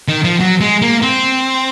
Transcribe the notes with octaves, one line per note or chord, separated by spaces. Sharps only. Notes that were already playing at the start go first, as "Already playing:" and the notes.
D#3
F3
F#3
G#3
A#3
C4